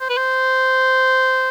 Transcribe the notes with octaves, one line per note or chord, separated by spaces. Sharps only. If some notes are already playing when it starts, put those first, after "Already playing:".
C5
B4
C5